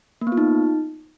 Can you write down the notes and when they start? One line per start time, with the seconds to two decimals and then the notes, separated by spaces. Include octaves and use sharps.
0.21 A#3
0.27 B3
0.32 F4
0.37 D#4